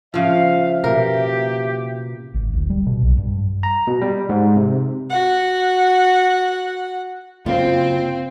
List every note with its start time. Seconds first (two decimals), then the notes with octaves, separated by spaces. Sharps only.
0.14 C#3 F3 E5 F5
0.84 B2 A#3 G4 A#4
2.34 G#1
2.53 D1
2.70 G3
2.86 B2
3.02 B1
3.17 G2
3.63 A#5
3.87 B2
4.01 G3
4.29 G#2
4.56 C3
5.10 F#4 F#5
7.46 C#3 A#3 C4 F4